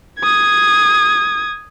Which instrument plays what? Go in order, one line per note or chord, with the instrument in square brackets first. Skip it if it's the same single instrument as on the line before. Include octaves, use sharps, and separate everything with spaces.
[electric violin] D#6 G#6